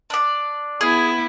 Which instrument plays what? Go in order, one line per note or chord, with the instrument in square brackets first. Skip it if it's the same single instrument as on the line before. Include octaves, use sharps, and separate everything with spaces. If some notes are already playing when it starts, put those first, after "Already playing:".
[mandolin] D4 D5
[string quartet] B3 E4 [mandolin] G#4